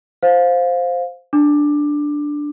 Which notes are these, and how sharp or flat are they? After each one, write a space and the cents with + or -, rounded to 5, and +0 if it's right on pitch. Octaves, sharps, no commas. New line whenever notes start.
C5 +0 F5 +15
D4 +0 D6 +15